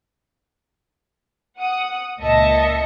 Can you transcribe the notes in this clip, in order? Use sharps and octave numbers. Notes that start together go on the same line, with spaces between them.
F#5 D#6
C#2 A#2 D#5 E5 A5 C#7